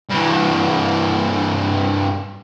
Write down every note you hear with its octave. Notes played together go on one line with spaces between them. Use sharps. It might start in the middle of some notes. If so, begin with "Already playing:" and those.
G2 E3